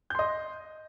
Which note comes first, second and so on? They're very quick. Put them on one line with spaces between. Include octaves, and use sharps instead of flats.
G6 C6 D#5